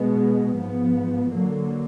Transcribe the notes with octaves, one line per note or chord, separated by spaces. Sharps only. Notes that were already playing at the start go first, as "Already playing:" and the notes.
Already playing: B2 G#3 B3
G#2 F3 B3
D3 F#3 A#3